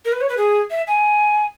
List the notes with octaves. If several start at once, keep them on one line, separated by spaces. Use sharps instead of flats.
A#4
B4
C#5
B4
G#4
E5
G#5